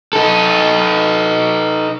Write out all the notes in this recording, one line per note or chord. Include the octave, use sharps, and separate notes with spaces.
D#4 A4